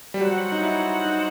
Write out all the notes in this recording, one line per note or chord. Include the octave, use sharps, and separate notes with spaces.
G3
F#3 F#4 C5 F#5
D#4
E4
D#4